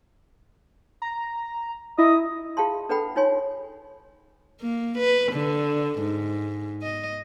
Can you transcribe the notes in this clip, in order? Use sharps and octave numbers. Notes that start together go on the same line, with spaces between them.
A#5
E4 D#5
F4 G#4 F5 A5 C6
D4 A4 B4 F#5 G5 B5
D#4 F4 C#5 G#5 C6
A#3
B4
D3
G#2
D#5